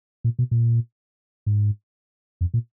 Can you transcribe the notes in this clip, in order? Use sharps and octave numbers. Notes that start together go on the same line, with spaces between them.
A#2
B2
A#2
G#2
F2
A#2